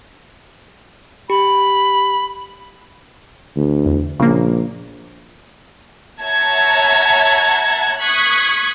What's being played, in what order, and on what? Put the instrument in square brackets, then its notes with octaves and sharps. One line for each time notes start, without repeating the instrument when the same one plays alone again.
[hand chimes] G4 [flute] B5
[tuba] D2
[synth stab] E2
[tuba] A#1 [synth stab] C#3 A#3
[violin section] C#5 E5 F#5 A5 A#5 G#6
C#6 D#6 F#6 G#6 B6